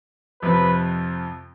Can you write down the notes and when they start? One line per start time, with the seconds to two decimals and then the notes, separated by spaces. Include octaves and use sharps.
0.42 F2 C3 F3 B4